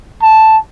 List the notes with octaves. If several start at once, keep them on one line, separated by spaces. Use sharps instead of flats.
A5